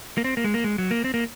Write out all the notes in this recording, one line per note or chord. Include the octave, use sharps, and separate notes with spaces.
A#3
C4
A#3
G#3
A#3
G#3
F#3
A#3
C4
A#3